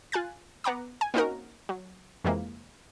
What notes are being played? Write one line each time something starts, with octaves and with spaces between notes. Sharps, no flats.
F4 G#5 F#6 A6
B3 F#5 A#5 D6
G#5
A#3 C4 C#4 D#4 F#4 A#4
F#3
F2 C3 E3 G#3 A#3